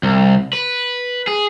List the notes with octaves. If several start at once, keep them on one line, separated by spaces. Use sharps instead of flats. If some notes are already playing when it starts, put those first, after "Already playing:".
C2
B4
G#4